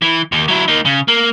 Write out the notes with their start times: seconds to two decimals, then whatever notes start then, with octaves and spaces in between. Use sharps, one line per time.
0.02 E3
0.32 D#2
0.48 F#3 E4
0.68 A#3 D#4
0.85 C#3
1.08 A#3